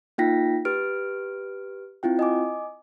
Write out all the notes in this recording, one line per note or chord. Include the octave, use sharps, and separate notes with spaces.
A#3 D#4 F4 G5 A#6 B6
G4 B4 F6 D7
C4 E4 F4 G5
D#5 G#5 D6